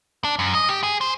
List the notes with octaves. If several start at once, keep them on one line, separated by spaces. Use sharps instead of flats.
D4
F#2
D#5
G4
G#4
C5